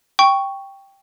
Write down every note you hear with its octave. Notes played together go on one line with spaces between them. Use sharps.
G5 C#6